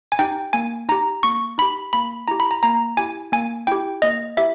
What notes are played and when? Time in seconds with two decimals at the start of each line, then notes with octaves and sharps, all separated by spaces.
0.12 G#5
0.19 D#4 G4 G5
0.53 A#3 G#5
0.89 D#4 G4 A#5
1.23 A#3 C#6
1.58 D#4 G4 B5
1.93 A#3 B5
2.28 E4 G4 A#5
2.40 B5
2.51 A#5
2.63 A#3 A#5
2.97 E4 G4 G#5
3.32 A#3 G#5
3.67 E4 G4 G5
4.02 A#3 D#5
4.37 E4 G4 E5